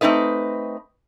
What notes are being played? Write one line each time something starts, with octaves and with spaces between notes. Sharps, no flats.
A3 C4 D#4 B4 D#5